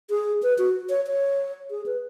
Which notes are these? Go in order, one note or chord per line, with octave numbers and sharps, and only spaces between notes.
G#4
B4
F#4
C#5
C#5
G#4
B4